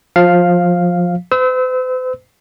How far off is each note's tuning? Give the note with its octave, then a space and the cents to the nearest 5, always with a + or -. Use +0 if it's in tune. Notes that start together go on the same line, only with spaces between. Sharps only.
F3 +20 F5 +0
C5 -45 E6 -30